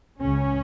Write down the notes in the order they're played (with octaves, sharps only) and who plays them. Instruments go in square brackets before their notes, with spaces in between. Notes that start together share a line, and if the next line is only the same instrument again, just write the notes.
[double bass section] C#2 C#3 C#4